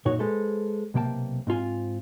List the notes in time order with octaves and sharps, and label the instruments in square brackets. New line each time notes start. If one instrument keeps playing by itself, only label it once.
[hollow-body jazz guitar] F#2 A#2 D#4 F#4 C#5
G#3 A4 B4 C5
B1 C3 A#3 G5 A5
G#2 C4 F4 G#5